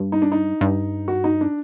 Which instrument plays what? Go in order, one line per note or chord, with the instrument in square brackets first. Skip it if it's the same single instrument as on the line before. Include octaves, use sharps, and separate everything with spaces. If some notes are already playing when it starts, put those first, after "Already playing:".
Already playing: [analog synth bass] G2
[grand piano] D#4
D4
D#4
[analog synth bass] G2
[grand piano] F#4
D#4
D4